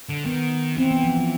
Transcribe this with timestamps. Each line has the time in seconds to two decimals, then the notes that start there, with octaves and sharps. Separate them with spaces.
0.09 D3
0.25 D#3 B3
0.77 E3 C4
0.91 B3
1.04 F3
1.17 F3